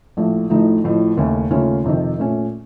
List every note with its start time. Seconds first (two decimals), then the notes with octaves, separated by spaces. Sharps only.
0.17 A#1 A2 A3
0.50 A1 A2 F3 A3 D#4
0.84 A1 A2 F3
1.17 D#2 C#3 A3 C#4
1.50 D#2 C#3 A3 C#4 F4
1.84 F2 C3 D#3
2.18 A#2 A3 C#4